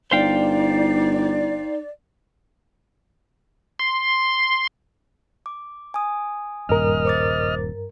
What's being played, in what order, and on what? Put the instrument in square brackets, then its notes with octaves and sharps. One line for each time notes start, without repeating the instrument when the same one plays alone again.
[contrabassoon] G1 [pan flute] D#4 [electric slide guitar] C5 F5 G5 [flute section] D5
[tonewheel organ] C6
[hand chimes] D6
G#5 D#6
[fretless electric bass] D#1 [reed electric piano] G2 A#4 [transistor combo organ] D#5 F6
[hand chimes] C5 D6 A6